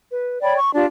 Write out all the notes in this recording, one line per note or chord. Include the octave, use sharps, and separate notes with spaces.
B4
C#5 D5 G5 B5
C#6
D4 F4 G4 D5